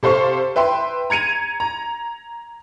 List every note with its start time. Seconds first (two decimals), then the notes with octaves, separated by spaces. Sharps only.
0.03 C3 A4 C5 F5 C#6
0.56 B4 E5 G5 C6
1.10 A#5 G#6 C#7 D#7 F7
1.60 A#5